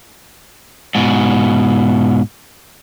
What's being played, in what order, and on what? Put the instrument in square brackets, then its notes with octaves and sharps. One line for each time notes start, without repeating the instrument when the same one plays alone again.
[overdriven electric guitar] G#2 B2